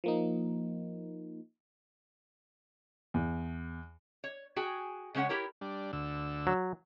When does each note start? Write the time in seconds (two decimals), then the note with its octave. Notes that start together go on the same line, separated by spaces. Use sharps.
0.04 F3 A#3 D#4
3.14 E2
4.24 C#5
4.56 F#4 G#4 G5 G#5
5.15 C#3 G#3 C#4 C#5 F#5
5.29 E4 G4 A#4 C#5
5.61 G3 D4
5.93 D2 D3 E6
6.47 F#3